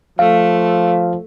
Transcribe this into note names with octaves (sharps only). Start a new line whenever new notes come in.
F3 A3 F5